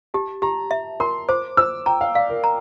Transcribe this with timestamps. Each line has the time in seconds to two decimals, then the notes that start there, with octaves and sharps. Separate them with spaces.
0.14 G4 A5
0.42 G4 A#5
0.71 E5
1.00 A#4 C6
1.29 C5 D6
1.57 C5 E6
1.86 G5 A#5
2.01 F5
2.15 D5 F5
2.30 A#4
2.44 A#5